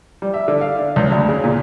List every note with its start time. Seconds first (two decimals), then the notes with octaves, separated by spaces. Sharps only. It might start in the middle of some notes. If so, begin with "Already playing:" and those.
0.22 G3
0.34 E5
0.48 D3
0.61 F5
0.78 D4
0.96 C#2
1.11 D2
1.29 C#3
1.44 A#2